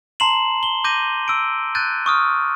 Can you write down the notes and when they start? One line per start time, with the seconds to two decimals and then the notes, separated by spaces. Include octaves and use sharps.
0.20 A5 A#5 C6 C7 E7 F#7
0.63 G7
0.84 D6 G6 A#6 D#7
1.28 E6 D7
1.75 F#6 G6 A6 D#7
2.06 C#6 D#6 F6